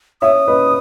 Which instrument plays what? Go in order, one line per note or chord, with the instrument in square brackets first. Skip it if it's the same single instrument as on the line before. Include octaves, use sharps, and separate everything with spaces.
[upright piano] C#5 E5 [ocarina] D#6
[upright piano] B4 D#5